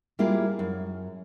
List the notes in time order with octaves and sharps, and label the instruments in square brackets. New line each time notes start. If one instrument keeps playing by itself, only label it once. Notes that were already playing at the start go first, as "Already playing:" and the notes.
[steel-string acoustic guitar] G3 A#3 E4 F4 G#4
F#2